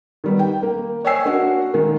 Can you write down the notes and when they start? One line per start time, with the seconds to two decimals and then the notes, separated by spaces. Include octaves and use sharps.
0.24 D#3 G3 B3
0.39 G5
0.63 A#3
1.05 C#5 D#5 G5 G#5 E6 C7
1.25 A#3 D4 F#4 A#4
1.73 D#3 G#3 A#3